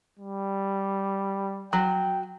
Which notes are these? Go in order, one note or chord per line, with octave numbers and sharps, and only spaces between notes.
G3
F#3 G5